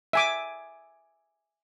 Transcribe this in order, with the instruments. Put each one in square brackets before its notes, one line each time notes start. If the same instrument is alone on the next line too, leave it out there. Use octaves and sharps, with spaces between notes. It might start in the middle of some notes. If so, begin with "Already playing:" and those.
[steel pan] E5 G#5 D6